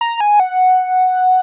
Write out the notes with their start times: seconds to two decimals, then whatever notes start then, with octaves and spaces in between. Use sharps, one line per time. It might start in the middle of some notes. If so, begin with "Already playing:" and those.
0.01 A#5
0.20 G#5
0.40 F#5